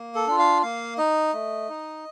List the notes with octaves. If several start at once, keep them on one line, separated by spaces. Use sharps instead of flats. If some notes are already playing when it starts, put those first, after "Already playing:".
Already playing: A#3
A4
D4 F4
F5
A#3 F5
D#4 D#5
A3
D#4